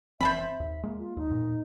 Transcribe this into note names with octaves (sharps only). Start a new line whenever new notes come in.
F1 E3 C4 C5 E5 A5 B5
D#2
G#3 A#3
F4
D#2 D#4
E2 A#2